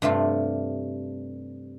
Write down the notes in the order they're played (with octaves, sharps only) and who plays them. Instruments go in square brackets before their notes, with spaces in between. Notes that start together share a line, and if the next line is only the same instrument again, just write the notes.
[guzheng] G2 C3 A3 F4